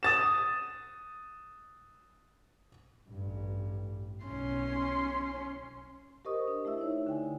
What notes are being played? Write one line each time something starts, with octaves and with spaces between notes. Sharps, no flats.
D#6 A6 E7
A1 G2
B1 C#4 C6
G4 A#4 C5 D#5 C#6 D#6
D4
A3 E4 E5 E6
D#4 C#5
D3 G5 G#5